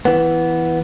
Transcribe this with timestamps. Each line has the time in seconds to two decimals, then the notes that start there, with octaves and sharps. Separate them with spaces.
0.05 E3 B3